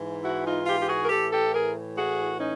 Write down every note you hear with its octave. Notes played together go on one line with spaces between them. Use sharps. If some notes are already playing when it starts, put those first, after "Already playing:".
Already playing: G#2 E3
E4 F#4
D#4 F4
F4 G4
G4
F#4 G#4
A#4
A2 E3 G4 A4
G4 A4
G#4 A#4
F#4 G#4
C#4 D#4